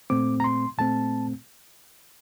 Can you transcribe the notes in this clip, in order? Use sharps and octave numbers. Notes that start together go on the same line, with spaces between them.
A#2 A3 C4 D6
A#5
C6
A#2 A3 C4 A5